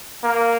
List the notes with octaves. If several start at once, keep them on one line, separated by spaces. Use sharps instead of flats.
A#3